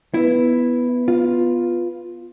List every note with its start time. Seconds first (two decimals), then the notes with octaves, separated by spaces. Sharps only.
0.14 B3 E4 B4
1.08 F4